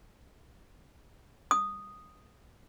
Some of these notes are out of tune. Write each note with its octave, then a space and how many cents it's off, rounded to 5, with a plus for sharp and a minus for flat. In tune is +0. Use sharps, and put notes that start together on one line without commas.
D#6 -5